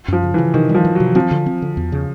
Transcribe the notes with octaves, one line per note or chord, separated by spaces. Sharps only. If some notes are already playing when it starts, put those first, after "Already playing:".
F#2 F3
C#3
E3
C#3
C3 D#3
G3
F3
E3
F#3
C3
F3 C4
D3
C4
D3
E2
C#3